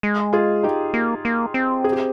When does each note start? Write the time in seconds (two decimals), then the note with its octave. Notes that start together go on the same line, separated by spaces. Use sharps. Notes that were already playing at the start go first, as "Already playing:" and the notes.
0.03 G#3
0.33 F4 G#4
0.63 D#4 G4
0.94 A#3
1.25 A#3
1.54 C4
1.84 G#4
1.92 G4